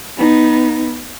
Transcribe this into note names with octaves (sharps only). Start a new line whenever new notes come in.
B3 D#4